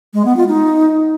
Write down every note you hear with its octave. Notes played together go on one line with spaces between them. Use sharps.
G#3
B3
F4
D#4